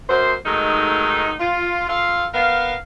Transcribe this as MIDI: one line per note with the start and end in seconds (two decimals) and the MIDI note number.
0.09 0.33 42
0.09 0.33 72
0.45 1.32 51
0.45 1.32 54
0.45 1.32 56
0.45 1.32 57
0.45 1.32 63
1.40 1.88 65
1.88 2.25 65
1.88 2.25 69
1.88 2.25 77
2.33 2.74 59
2.33 2.74 70
2.33 2.74 77